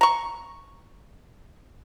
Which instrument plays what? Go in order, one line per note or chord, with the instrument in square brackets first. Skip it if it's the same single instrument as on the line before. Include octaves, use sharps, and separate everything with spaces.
[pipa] A#5 C#6